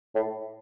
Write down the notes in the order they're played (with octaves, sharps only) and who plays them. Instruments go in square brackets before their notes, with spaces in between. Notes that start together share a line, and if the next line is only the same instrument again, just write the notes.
[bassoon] A2